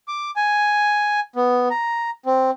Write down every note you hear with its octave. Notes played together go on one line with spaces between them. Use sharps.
D6
G#5
B3
A#5
C4